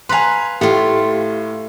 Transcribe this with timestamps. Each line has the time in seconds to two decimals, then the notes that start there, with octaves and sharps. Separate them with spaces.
0.09 B4 F5 G#5 A#5 C6
0.61 A2 A3 F4 G4